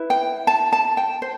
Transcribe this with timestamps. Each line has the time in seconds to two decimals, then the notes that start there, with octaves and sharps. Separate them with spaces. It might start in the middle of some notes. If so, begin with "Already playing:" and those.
Already playing: E4 B4
0.10 G5
0.47 A5
0.73 A5
0.97 G5
1.22 C5